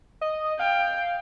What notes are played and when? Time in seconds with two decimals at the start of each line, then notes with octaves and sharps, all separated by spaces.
0.21 D#5
0.59 F5 G5